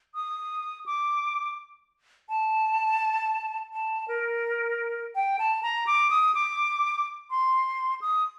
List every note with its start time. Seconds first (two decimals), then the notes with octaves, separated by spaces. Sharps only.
0.15 D#6
0.86 D6
2.29 A5
3.73 A5
4.08 A#4
5.15 G5
5.39 A5
5.63 A#5
5.87 D6
6.10 D#6
6.35 D6
7.30 C6
8.01 D#6